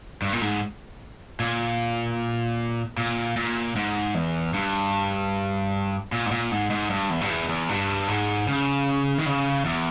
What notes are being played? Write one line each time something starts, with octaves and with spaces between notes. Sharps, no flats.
G2
A#2
G#2
A#2
A#2
A#2
G#2
E2
G2
A#2
G#2
A#2
G#2
G#2
G2
E2
G2
E2
E2
G2
G#2
C#3
D#3
C#3
E2